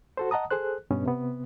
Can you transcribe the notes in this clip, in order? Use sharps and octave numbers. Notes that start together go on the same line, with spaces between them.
F#4 A4 C5
D#5 F#5 A5 A#5 D#6
G#4 A4 C5 F#6
G2 B2 B3 C#4
C3 B3